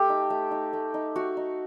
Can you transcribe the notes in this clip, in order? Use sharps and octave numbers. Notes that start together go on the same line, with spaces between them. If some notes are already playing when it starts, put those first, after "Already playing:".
Already playing: A3 G4 A4
D#4
A3
D#4
A3
D#4
A3 F#4
D#4